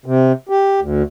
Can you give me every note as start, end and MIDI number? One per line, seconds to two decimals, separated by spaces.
0.06 0.32 48
0.49 0.80 67
0.81 1.03 38